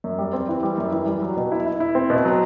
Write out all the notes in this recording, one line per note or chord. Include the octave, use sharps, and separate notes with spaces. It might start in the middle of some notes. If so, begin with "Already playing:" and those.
F#2
G3
C4
E3
G3
F#2
E3
G3
F#3
B2
E4
E4
E4
C4
B2
F#3